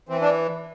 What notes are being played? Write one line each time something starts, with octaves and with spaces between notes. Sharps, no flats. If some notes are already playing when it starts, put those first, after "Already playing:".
E3 C4
D4